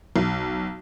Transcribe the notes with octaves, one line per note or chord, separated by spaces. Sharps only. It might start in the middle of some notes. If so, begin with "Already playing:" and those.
B1